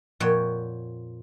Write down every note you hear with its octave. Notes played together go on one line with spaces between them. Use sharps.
F2 A#2 C#5 F#5 G5